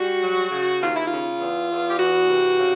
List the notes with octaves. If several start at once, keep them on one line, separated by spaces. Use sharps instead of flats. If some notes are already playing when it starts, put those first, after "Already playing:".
Already playing: G3 F#4
F#3
C#3
D#2 F4
E4
C#3 F4
E2
E2
G4
E3 F#4
C3
C#3